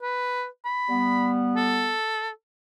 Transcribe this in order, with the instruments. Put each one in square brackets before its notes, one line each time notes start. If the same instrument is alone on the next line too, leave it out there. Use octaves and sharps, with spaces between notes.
[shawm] B4
B5
[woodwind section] G3 B3
[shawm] A4